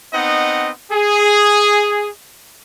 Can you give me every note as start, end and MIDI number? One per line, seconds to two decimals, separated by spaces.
0.13 0.71 59
0.13 0.71 60
0.13 0.71 63
0.13 0.71 75
0.13 0.71 78
0.91 2.08 68